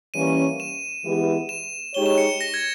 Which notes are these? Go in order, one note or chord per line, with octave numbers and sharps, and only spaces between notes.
E3 G3 A#3 C#4 D#7
E7
E3 G#3 B3 E4 G4
E7
G#3 D#4 G4 C#5 G7
E7
C#7
A#6
G#6